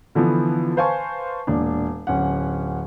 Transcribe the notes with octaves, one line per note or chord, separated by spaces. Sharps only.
D3 E3 F3 B3
B4 C5 F5 G#5 A5 C#6
E1 A#2 D4
D1 C#4 F#5